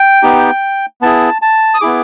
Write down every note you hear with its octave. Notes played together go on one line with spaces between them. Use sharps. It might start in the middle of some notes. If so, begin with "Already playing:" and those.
Already playing: G5
B3 D#4 G4
B3 E4 G#4 A5
A5
D#6
B3 E4 G#4 D6